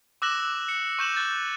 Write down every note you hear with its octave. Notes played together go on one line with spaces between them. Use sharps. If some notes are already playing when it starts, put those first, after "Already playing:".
D6 E6 F#6 A#6 E7 F#7
C#7
C#6 G6 E7 F#7
F#6 G6 A6